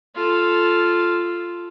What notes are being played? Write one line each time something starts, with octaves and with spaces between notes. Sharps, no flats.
F4 A4